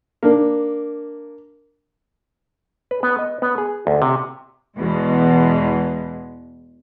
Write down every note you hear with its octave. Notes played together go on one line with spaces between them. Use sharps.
A#3 D4
B4
B3
D#5
B3
G#4
D2
C3
E2 B2 G#3